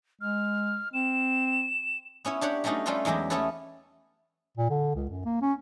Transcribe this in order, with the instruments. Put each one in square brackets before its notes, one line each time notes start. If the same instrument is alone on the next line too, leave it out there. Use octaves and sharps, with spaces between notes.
[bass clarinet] G#3 [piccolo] F6
[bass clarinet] C4 [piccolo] E7
[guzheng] B3 C#4 E4 C#5
D4 G4 C#5 F#5
F#3 G3 A3 C#4 D#4 F#4
G3 A3 C#4 F4 A4 B4
E2 F#3 G#3 E4 G4
A3 B3 C#4 E4 A4 B4
[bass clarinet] A#2
D3
C#2
F#2
A#3
C#4